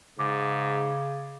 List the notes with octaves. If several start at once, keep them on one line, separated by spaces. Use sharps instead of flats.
G#2 C#3 D6